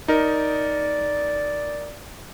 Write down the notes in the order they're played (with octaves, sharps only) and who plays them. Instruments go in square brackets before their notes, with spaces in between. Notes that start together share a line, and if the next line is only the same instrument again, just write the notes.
[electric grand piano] D#4 A#4 [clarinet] D5